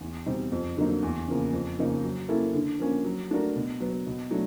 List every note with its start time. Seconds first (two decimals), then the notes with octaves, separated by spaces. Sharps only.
0.01 E2
0.26 B2 G3 C4 D#4
0.52 F2
0.77 D3 F#3 A#3 D#4
1.03 E2
1.28 C#3 F3 A#3
1.53 F2
1.78 C#3 F3 A#3 D#4
2.04 F#3
2.28 A#3 C#4 E4 A4
2.54 D3
2.79 F3 A#3 C#4
3.05 F#3
3.31 A3 D4 F#4 A#4
3.56 B2
3.80 F#3 B3
4.07 B2
4.31 F#3 A3 D4